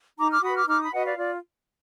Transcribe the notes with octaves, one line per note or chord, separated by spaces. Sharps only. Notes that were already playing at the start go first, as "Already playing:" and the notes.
D#4 A#5 D6
D6 F6
F#4 B4 B5 D#6
D6 F6
D#4 D6 F6
B5 D#6
F#4 B4 D#5 F#5
D5 F5
F4 D5